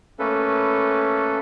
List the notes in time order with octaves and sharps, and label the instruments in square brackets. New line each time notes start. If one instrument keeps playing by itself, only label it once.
[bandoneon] A3 A#3 C#4 A4 B4